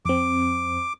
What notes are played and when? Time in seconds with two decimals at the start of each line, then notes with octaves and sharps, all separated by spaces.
0.05 F2 C4 D6